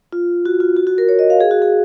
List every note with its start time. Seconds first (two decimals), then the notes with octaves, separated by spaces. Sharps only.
0.13 F4
0.45 F#4
0.60 F4
0.77 F#4
0.87 F#4
0.98 A#4
1.09 C#5
1.19 D#5
1.30 F5
1.41 G#4
1.51 F#4
1.62 G#4